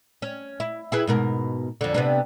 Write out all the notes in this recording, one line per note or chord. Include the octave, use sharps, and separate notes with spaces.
C#4
E4
E4 G#4 B4
G#2 B2 A#4
F2 D3
C3 B3 D4